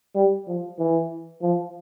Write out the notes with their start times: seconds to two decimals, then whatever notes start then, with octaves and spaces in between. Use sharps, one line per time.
0.15 G3
0.47 F3
0.79 E3
1.42 F3